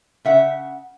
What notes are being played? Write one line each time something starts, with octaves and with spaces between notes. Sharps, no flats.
C#3 E5 F#5